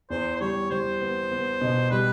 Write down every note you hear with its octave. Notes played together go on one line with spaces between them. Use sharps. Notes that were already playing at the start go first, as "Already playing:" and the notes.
E2 C5
C5
G3 C#5
G3 C5
B3
B3
B2
G3 B4